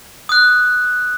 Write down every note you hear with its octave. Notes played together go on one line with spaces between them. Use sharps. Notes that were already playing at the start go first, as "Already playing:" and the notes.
D#6 F#6